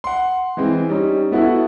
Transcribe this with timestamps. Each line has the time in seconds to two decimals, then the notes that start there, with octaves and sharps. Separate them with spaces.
0.04 F#5 C6
0.57 E3 G#3 C4
0.89 G3 C#4 D#4
1.31 A3 B3 E4 F#4 A4